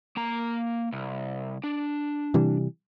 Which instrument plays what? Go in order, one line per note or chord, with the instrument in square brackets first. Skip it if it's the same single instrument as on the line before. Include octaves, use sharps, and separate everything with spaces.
[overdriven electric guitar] A#3 A#5
C2
D4
[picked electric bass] C3 E3 G3